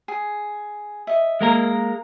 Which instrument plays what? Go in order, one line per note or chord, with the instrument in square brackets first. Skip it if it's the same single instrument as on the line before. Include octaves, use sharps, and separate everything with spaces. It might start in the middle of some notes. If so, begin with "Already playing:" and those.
[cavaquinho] G#4
D#5 E5
[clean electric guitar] G#3 A#3 A#4